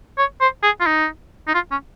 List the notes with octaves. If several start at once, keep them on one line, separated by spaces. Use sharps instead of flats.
C#5
C5
G#4
F4
D#4
D#4
F4
C#4